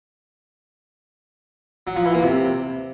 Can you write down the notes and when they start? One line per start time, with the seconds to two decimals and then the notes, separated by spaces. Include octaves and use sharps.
1.87 F#3
1.96 F3
2.05 E3
2.14 A#3
2.23 C3